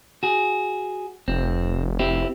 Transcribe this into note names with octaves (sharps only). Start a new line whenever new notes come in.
F#4 G#4
F1 C4
C4 E4 G4